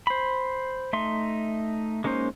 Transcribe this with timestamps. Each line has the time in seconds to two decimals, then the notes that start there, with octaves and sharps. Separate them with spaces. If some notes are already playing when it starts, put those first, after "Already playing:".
0.07 C5 B5
0.93 A3 D#4 E5 C6
2.04 G#3 A#3 C#4 D#4 C5